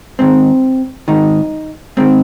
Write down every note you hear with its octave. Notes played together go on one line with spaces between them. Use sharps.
G#2 D#3 C4
G#2 D#3 D#4
G#2 D#3 C4